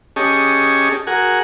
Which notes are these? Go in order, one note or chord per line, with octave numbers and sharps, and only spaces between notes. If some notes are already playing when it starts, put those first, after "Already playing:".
C#4 G4 G#4 D#5 A5 C#6
F#4 G#4 A#4 F#5 G#5